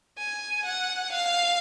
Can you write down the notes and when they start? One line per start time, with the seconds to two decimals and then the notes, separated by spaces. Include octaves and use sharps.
0.17 G#5
0.64 F#5
1.12 F5